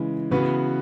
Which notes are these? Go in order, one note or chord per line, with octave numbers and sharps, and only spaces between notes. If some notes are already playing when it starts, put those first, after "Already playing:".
Already playing: C#3 E3 G#3
C#3 E3 B3 F#4 B4